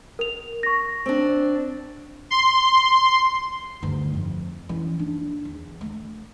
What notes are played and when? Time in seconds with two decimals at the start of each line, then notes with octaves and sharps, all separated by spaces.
0.19 A#4 F7
0.63 C#6 A#6
1.06 C4 D4
2.30 C6
3.82 D2 G2
4.14 F2
4.69 E3 C#4
4.98 F#1 D4
5.45 E2
5.81 A3